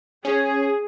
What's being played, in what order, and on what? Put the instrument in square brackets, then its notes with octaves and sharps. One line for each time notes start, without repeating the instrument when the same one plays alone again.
[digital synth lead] C#4 [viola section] G#4